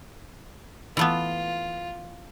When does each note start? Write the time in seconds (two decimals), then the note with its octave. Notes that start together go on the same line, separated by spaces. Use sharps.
0.97 E3 A3 B3 F4